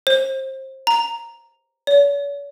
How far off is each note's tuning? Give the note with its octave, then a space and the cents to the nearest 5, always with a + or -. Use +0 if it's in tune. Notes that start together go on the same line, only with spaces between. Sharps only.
C5 +25
A#5 +0
C#5 +45